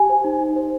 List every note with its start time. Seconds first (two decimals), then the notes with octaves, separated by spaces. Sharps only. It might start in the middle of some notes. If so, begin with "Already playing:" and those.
Already playing: G4 G#5
0.09 C5
0.24 D#4
0.41 D#4
0.56 C5